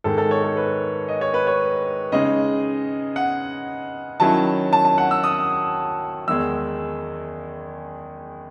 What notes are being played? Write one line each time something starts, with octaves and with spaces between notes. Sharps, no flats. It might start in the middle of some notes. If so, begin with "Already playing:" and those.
G#2 D#3 G#3 A4
A4
C#5
A4
B4
D#5
C#5
B4
C#5
C#3 G#3 D#4 D#5
F#5
D#3 F#3 C#4 E4 A5
A5
A5
F#5
E6
D#6
E2 D#3 G#3 D#4 E6